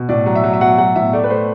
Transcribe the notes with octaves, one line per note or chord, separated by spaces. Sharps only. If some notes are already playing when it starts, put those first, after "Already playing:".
Already playing: B2
A2 D5
F#3
E5
F#3
E5
F#3 F#5
F#3 F#5
A2 E5
A3 D5
B4
A3 C5